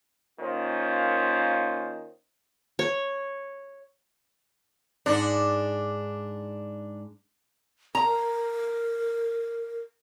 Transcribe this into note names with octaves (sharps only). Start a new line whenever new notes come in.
D#3 A#3 C#4 F4 C5
C#5
G#2 D4 F#5
A#4 A#5